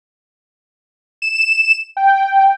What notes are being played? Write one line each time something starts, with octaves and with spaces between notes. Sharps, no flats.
E7
G5